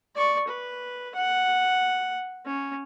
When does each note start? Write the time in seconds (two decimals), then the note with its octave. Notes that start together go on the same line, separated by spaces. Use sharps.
0.15 D5 C#6
0.47 B4
1.15 F#5
2.45 C#4